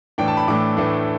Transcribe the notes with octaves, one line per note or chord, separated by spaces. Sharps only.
A2 E3 A3 D4 G5
A5
B5
A2 E3 A3 D4 D6
A2 E3 A3 D4